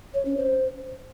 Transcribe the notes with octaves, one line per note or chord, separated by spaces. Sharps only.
C#5
C#4
C5